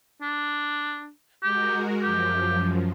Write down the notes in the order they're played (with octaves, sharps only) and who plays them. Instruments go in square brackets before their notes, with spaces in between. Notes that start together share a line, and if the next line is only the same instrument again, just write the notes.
[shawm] D4
[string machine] G#3 F#4 A#4 [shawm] G4
[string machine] F#2 F3 [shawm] G4